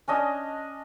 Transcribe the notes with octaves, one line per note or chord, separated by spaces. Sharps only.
C#4 D4 D#5 G#5